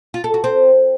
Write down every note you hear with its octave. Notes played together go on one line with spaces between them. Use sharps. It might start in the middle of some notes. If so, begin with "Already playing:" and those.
F4
A4
F#4
C4